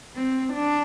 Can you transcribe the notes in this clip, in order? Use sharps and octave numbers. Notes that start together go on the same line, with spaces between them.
C4
D4